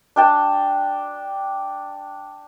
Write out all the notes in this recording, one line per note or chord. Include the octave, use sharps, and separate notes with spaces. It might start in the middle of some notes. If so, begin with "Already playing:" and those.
D4 G5 A5